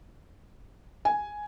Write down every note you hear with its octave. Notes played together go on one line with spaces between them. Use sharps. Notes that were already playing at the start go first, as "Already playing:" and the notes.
G#5